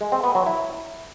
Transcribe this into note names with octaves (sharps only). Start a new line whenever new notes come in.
G#3
C4
B3
F#3
E4